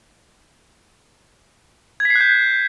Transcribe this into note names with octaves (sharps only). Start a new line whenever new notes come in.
G#6
B6
C7
F#6
G6